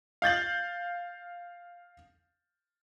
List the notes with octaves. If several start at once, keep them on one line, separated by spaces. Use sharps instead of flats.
F5 G6 A6 F#7